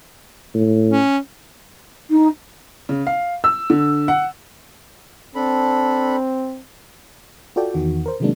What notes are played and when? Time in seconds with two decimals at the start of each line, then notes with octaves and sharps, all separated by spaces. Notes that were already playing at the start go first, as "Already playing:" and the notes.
0.54 A2
0.88 C#4
2.10 D#4
2.89 C#3
3.07 F5
3.44 E6
3.70 D3
4.08 F#5
5.35 C4 D4 A4 B5
7.56 F4 F#4 A4 D5 G5
7.74 E2 D#3 F#4
8.06 A#4 C5
8.20 C3 D#3 F#3 G#3 A#3 D4